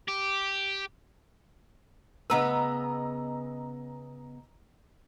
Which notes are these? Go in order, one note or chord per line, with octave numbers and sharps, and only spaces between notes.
G4
C#3 B3 B4 D#5 A#5 E6